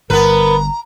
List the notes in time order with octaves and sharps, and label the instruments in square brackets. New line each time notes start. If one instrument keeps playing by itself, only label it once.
[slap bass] G1 G2 [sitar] B3 B4 [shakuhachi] A#4 [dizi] A#5